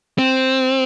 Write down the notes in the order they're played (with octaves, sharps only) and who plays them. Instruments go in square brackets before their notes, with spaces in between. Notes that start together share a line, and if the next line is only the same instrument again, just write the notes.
[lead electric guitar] C4